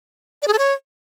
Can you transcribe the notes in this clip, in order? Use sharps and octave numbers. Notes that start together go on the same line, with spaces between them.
D5
G#4
A4
C#5